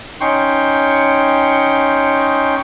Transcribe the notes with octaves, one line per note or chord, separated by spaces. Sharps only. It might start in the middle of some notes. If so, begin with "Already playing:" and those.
C#4 D#4 G5 C6 C#6